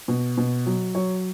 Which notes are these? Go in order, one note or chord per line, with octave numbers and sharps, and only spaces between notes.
B2
B2
F#3
F#3 C#5